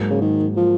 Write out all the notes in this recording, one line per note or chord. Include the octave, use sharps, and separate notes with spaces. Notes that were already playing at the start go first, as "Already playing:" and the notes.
Already playing: G#2 F#3 A#3
C#3
D#3
F3